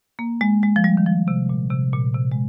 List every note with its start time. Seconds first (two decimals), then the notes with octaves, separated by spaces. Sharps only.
0.19 A#3
0.41 G#3
0.63 G#3
0.76 F3
0.84 G3
0.97 D#3
1.06 F3
1.28 C3
1.49 A#2
1.71 C3
1.93 A#2
2.14 C3
2.32 G#3